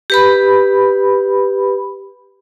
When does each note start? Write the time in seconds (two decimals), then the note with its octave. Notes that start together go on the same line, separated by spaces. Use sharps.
0.10 G4 B4 B5